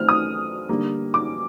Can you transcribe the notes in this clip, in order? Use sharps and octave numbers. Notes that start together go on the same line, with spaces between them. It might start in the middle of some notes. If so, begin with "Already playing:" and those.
Already playing: D#3 A3 C4 F6
D#6
D3 G3 A#3
D6